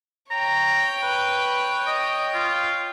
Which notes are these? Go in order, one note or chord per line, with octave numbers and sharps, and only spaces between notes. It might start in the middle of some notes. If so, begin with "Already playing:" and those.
C#5 G5 A#5
B4
D#5
F4